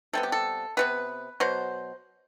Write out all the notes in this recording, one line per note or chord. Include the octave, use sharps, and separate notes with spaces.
C3 G3 B3 A4
G4
A4
C3 G3 B3 B4
B2 F#3 C5